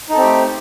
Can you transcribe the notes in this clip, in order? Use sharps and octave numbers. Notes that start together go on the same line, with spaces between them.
A3 C4 D#4 G4 A4